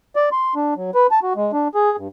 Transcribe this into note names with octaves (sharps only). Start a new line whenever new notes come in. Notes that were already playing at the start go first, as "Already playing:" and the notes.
D5
C6
D4
F#3
B4
A5
F#4
G#3
D4
G#4
G2